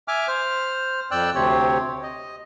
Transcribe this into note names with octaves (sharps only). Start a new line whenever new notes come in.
E5 G#5 D6 F6
C5 F6
F2 D5 G5 E6 F#6
D2 C3 C4 G4 C#5
D#5